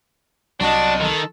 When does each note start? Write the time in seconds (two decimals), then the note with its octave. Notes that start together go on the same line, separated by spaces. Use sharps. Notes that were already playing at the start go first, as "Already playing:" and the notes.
0.60 C2 F#3 D4 F#4 D#5 A5
1.01 D#3 A4